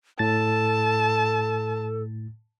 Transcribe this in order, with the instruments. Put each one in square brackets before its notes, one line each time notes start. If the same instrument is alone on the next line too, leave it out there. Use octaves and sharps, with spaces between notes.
[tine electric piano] A2 A6 [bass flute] A4 [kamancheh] A5